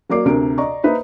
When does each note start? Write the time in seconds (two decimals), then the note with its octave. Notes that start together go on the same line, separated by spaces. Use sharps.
0.10 F#3 A#3 A#4 D5 D6 C7
0.25 D2 C3 A#4 D7
0.58 D5 D#5 A#5 C#6
0.84 A#3 D#4 B4 C5 E5